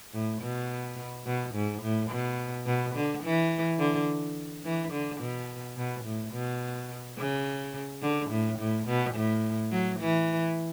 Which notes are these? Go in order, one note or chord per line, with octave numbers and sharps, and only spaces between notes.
A2
B2
B2
G#2
A2
B2
B2
D3
E3
D3
E3
D3
B2
B2
A2
B2
C#3
D3
A2
A2
B2
A2
F#3
E3